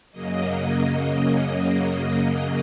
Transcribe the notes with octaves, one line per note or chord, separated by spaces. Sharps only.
F#2 C#3 F#3 A#3 D#5
D#5